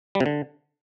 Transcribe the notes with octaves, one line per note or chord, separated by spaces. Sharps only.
G3
C3
D3